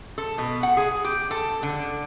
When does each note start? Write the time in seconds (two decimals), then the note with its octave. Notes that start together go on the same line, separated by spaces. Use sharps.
0.18 A4
0.38 B2
0.63 F#5
0.77 G#4
1.04 G4
1.31 A4
1.63 D3